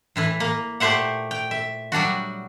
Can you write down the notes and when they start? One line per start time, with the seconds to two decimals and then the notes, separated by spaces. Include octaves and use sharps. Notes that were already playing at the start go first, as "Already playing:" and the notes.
0.16 A2 E3 E4
0.40 A#3
0.80 A#2 A3 G4 C5 E5 F#5
1.31 G5
1.51 E5
1.92 F#3 G3 D4 F#4